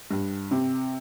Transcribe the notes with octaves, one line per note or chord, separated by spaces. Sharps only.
G2
C3